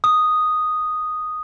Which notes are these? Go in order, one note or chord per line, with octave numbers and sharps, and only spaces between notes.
D#6